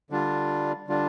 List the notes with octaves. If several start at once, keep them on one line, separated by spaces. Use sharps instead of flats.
D3 G3 D4 F4
D3 G3 D4 F4